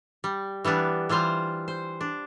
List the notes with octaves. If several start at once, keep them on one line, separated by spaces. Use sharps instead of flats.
G3
E3 G3 B3 D4
E3 G3 F4 C5
C5
D4